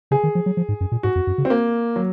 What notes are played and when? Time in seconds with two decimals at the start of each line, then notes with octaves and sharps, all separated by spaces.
0.11 C#3 G#4
0.24 D#3
0.35 F3
0.46 F#3
0.57 F3
0.69 G#2
0.81 F#2
0.92 A#2
1.03 G#2 F#4
1.16 F2
1.27 F#2
1.38 C#3
1.45 C4
1.50 A#3
1.96 F#3